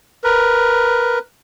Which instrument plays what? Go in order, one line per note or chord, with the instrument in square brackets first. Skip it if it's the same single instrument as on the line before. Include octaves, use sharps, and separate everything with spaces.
[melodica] A#4 B4